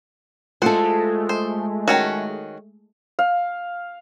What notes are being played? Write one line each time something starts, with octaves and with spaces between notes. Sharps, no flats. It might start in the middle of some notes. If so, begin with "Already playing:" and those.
G#3 A3 F4 A4 C5 F#5
C5
D#3 C#4 F#4
F5